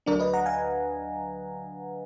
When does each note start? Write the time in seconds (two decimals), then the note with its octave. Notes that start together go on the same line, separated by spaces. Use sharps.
0.06 D2 D3 F#3 D4 A#4 D5
0.20 B4 D#5
0.33 F#5 A#5
0.46 F5 G#5